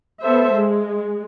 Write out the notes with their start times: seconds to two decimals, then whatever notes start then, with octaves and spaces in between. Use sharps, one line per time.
0.22 B3 A4 C5 E5
0.55 G#3